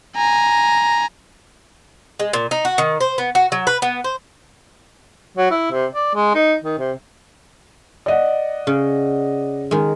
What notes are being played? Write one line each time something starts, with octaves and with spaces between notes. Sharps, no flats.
G#5 A#5
G#3
A#2
D#4
F#4
D#3
C5
B3
F#4
F#3
B4
B3
C5
F#3
E4
C3
D5
G#3
D#4
D#3
C3
D5 D#5 F#5
C#3
D#3 G#3